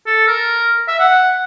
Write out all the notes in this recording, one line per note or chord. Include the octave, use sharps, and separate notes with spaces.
A4
A#4
E5
F#5